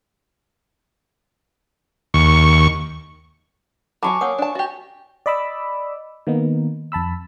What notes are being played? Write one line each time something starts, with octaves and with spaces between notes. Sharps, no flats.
D#2 C#6
F#3 F#4 G#5 A5 B5 C#6 D6
A#3 C#5 F#5 D#6
D4 A5
F#4 G4 D#5
D5 D#5 B5 D6 E6
D#3 A#3 B3 D#4
F2 A5 B5 E6